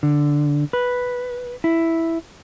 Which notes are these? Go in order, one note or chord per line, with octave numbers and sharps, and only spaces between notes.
D3
B4
E4